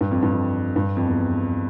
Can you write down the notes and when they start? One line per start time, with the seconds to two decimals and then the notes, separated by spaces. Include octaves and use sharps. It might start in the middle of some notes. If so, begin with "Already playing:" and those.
0.01 G2
0.11 F2
0.23 G2
0.33 F2
0.76 G2
0.97 F2
1.07 E2